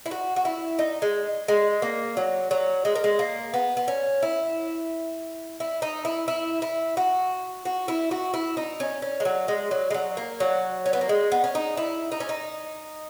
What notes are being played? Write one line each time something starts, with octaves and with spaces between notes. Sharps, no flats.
E4
F#4
F#4
E4
D#4
G#3
G#3
A#3
F#3
F#3
G#3
A#3
G#3
A#3
B3
B3
C#4
E4
E4
D#4
E4
E4
E4
F#4
F#4
E4
F#4
E4
D#4
C#4
C#4
G#3
F#3
G#3
F#3
G#3
F#3
A#3
F#3
C#4
B3
A#3
G#3
B3
C#4
D#4
E4
D#4
C#4
D#4